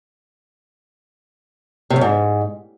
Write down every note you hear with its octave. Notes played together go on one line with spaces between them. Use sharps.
C3
F#2
G#2